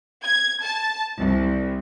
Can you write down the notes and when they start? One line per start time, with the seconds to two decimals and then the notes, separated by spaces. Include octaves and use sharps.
0.23 G#6
0.61 A5
1.18 C2